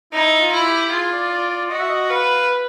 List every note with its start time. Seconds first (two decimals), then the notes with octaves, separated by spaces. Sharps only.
0.13 D#4 E4
0.39 F4
0.52 E4
0.66 G4
0.82 G4
0.92 F4 G#4
1.12 D5
1.31 D5
1.50 D5
1.70 F#4 D#5
1.80 E5
1.89 D#5
2.10 B4 F5
2.49 B4